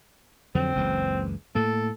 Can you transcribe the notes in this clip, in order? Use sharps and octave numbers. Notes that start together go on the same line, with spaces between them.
F2 D3 F#3 C4
F#1 C#2 E3
A2 A#3 A4